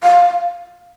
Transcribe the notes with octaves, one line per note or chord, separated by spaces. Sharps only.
F5